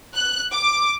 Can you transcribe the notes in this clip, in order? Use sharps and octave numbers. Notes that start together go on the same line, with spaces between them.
F#6
D6